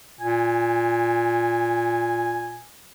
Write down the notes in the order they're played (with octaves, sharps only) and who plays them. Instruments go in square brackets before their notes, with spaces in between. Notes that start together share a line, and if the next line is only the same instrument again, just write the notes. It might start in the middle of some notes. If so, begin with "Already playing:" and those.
[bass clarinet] A#2 [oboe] G#5